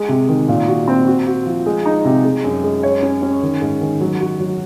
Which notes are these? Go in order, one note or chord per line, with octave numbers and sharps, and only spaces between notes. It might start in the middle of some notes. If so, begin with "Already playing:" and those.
Already playing: G#3
C3
D#3
A#2
F#4
C4
F#4
F#4
F3
G#3
D#4
C3
G#3
F#2
G#3
C#5
C#4
C#4
D#3
G#2
D#3
F#3
F#4
F#3